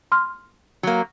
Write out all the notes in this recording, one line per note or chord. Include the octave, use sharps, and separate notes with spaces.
C6 F6
F#3 A#3